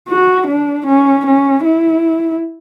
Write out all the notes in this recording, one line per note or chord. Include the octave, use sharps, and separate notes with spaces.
F#4
D4
C#4
C#4
E4